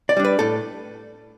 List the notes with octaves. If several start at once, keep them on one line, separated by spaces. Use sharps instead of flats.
D5
G3 D4
B4
A2 A4